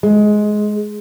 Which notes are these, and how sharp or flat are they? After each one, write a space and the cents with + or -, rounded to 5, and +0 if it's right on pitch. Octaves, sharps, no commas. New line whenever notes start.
G#3 +15